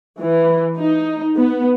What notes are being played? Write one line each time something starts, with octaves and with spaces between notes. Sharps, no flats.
E3
D#4
B3